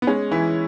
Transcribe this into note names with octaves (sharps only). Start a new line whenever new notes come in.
B3
G#3 C#4
E3 E4